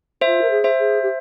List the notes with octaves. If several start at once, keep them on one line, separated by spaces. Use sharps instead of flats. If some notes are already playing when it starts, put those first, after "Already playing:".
F4 C5 E5
A#4
G#4
C5 E5
G#4
G4